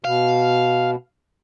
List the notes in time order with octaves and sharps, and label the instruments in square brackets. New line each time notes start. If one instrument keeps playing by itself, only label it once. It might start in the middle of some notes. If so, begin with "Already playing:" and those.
[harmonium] B2 [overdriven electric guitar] F5